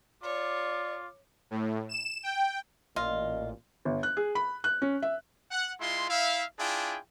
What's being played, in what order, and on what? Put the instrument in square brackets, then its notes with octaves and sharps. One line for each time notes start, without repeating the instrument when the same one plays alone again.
[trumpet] F4 [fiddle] C#5 [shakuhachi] D5 [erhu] D6
[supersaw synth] A2
E7
G5
[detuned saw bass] A1 [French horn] A#2 [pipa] F4 [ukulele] D#5
[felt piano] G1
F#6
G#4
B5
F#6
C#4
E5
[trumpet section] F#5
G#3 E4 F4 C6
E4 E5 F5
D4 E4 F4 G#4 G5